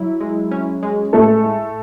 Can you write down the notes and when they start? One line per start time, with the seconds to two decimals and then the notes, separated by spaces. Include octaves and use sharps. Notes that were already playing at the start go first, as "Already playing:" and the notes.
Already playing: F#3 E4
0.21 G#3
0.51 C#4
0.83 G#3
1.13 A2 A3 A4
1.44 A2